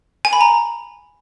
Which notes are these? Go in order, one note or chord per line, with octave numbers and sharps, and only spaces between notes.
G#5
B5
A#5